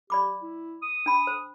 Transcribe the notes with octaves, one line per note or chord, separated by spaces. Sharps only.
G4 D5 B5 D6
E4
D#6
D4 G#5 B5
C5